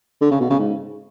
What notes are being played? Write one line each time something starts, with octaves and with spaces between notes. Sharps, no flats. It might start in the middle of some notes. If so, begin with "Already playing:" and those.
D3
C#3
B2
C#3
G#2